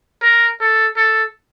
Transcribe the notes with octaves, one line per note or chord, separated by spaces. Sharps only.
A#4
A4
A4